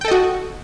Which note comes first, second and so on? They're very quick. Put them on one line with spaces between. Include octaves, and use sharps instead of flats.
G5 A4 D#5 F#4